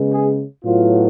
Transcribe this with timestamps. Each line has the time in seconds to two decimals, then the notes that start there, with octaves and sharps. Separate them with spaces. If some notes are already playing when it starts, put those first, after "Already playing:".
Already playing: C#3 G#3 B3
0.12 G#4
0.63 A2 F#3 B3 F4